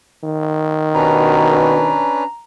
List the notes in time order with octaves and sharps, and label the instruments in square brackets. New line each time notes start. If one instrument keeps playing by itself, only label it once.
[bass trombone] D#3
[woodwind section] D#2 B2 [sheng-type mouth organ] C#4 D4 B4 [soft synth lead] A#5